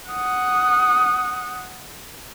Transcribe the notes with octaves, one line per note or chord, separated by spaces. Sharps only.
F#5 D#6